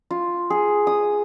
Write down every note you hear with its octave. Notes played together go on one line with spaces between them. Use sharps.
F4
G#4
D#6